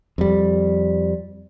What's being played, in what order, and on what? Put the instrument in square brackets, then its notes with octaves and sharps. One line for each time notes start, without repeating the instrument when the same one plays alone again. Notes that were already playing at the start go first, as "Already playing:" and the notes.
[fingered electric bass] F2 G3